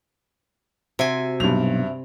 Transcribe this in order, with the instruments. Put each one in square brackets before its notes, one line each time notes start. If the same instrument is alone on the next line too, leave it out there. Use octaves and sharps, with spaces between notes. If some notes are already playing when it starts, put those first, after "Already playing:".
[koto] C3 G#5 [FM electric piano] F#4 C5 E5
[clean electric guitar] B1 [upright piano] G2 F7